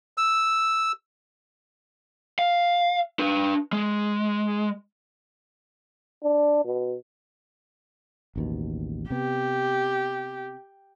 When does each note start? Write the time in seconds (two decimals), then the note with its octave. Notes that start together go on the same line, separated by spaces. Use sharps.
0.18 E6
2.39 F5
3.19 D4 B4
3.73 G#3
6.23 D4
6.64 B2
8.36 A1 D#2 B2
9.10 C3 B3 G4